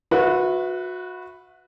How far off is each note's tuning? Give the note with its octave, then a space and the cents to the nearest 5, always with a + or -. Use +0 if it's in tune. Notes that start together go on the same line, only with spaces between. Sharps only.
F#4 -25 B4 +5 E5 +5